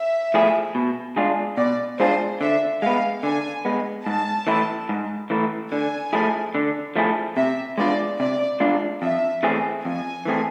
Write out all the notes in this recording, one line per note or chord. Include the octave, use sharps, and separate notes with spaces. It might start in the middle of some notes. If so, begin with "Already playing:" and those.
Already playing: E5
F3 A3 E4 G#4
B2
G#3 D4 F4 G#4
B2 D5
G#3 D4 F4 G#4 C5
D3 E5
G#3 B3 F5
D3 G#5
G#3 B3
G#2 A5
E3 A3 E4
G#2
E3 A3 E4
D3 G#5
F3 A3 E4 G#4
D3
F3 A3 E4 G#4
C3 E5
G#3 B3 D4 F4 D5
C3 D5
G#3 B3 D4 F4
F2 E5
E3 A3 C4 G#4
F2 G#5
E3 A3 C4 G#4